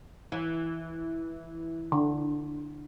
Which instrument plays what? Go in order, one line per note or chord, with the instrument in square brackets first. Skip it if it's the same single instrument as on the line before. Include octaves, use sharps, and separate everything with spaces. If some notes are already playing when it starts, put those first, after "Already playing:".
[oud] E3
[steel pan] D3